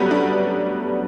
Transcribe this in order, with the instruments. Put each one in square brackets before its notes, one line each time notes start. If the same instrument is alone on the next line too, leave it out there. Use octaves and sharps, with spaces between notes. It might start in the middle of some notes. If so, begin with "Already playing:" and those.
Already playing: [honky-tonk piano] F#3 G3 A3 B3
D4